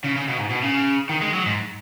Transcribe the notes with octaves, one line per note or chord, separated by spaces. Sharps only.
C#3
C#3
B2
G#2
B2
C#3
D#3
G#3
F#3
G#2